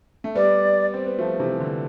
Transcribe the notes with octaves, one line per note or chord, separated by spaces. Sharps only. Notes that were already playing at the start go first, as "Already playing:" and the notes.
A3
G3 B3 D5
C4
B3
F3 A3
C3 E3
D3